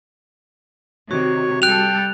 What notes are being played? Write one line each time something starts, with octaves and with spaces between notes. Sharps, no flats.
C3 D#3 F#4 C#5
G3 A4 G5 F#6 F7